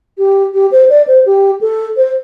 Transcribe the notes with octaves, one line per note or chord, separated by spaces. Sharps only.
G4
G4
C5
D5
C5
G4
A4
C5